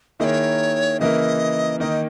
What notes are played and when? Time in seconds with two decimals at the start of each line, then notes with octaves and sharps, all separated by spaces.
0.20 D#3 A#3 E4 G#4 C#5 D#5
1.00 C#3 E3 A#3 E4 A#4 D#5
1.80 D#3 A#3 D#4 D#5